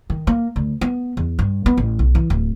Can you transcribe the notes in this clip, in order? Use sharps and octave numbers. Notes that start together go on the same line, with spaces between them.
D#3
A#3
D2
B3
E2
G2
B3
A1
B1
E3
D1